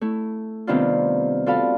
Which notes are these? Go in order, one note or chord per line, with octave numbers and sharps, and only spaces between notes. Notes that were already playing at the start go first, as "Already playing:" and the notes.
A3 E4
C3 D#3 G3 B3 D4 F4
F4 F#4 A4 D5 F5 B5